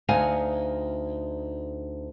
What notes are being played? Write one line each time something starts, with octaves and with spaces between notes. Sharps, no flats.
D2 D#4 F5 F#5 G#5